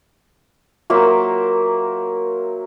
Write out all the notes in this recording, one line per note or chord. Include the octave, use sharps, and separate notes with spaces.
F#3 A#3 C5 E5